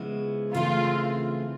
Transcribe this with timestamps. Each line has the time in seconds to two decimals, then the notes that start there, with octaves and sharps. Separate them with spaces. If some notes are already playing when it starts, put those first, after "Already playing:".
Already playing: C#3 F3 G#3 B3 E4
0.54 C#3 E3 A3 C4 E4 F4